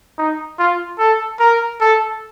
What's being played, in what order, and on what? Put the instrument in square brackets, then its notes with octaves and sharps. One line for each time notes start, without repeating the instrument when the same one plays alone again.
[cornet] D#4
F4
A4
A#4
A4